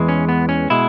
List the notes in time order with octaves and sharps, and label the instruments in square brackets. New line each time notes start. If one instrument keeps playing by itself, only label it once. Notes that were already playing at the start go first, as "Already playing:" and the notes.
Already playing: [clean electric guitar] E2 E3 G#3
C#4
B3
C#4
B2 G#3 E4